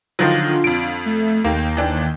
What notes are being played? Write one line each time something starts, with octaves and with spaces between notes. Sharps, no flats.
D3 D#3 F3 F#3 F4
F2 D7
A3
D#2 A#3 G5
E3 D4